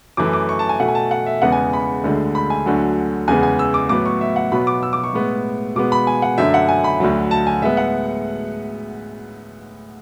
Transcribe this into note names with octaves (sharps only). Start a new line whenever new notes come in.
F#2 E3 A3 D6
D6
C#6
A5
G#5
B2 A3 F#5
G#5
A5
F#5
E5
E2 C#3 G#3 B3 F#5
G#5
B5
D2 D3 G#3
B5
G#5
D2 D3 F#3
E2 C#3 G#3 B3 G#5
G#5
E6
D6
A2 F#3 B3 D6
C#6
E5
F#5
B2 F#3 B3 B5
D6
E6
D6
C#6
A2 G#3 B3
B2 G#3 B3 D6
B5
G#5
F#5
F#2 D3 A3 E5
F#5
G#5
B5
D2 D3 F#3
A5
G#5
A2 G#3 B3 E5
F#5